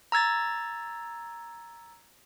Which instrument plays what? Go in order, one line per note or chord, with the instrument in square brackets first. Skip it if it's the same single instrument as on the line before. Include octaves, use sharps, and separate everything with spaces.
[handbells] A#5 E6 G#6 A6